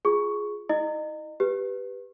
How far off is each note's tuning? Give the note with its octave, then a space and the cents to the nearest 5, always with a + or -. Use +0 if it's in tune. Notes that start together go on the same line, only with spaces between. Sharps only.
F4 +0 G#4 +5 C#6 +0
E4 -35 D#5 -30
G4 +0 B4 +0